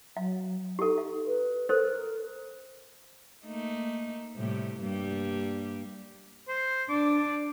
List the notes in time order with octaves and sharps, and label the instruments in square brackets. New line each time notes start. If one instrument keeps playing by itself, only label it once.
[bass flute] F#3 [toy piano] F5
[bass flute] D#4 [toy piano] G4 A4
[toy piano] F5
[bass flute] B4
[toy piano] A4 C5 [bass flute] A#4
[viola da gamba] A3 A#3 D#4
A2 C3 G3
G2 G3 A#3
[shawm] C5
[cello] D4 [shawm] D6